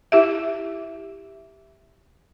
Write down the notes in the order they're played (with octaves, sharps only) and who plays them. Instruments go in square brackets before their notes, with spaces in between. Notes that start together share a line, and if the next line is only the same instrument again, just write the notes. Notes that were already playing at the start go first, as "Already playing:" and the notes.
[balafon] E4 G4 E5